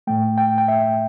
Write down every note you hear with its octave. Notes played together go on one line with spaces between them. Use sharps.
A2 A3 G5
G5
G5
E5